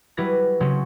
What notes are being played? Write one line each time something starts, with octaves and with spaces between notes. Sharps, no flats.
F#3 G3 E4 B4 G#6 A#6
C#3 F#3 C4 C#4